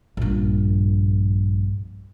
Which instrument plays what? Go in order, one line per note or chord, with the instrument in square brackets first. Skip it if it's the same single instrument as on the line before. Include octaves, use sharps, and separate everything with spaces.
[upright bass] A#1 G2